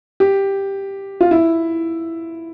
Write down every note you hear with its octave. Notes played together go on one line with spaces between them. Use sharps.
G4
F4
E4